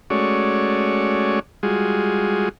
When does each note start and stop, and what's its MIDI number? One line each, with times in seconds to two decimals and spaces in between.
0.10 1.39 56
0.10 1.39 57
0.10 1.39 61
0.10 1.39 66
0.10 1.39 73
0.10 1.39 74
1.63 2.49 55
1.63 2.49 56
1.63 2.49 65
1.63 2.49 66
1.63 2.49 68